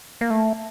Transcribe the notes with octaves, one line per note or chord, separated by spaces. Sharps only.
A#3
A3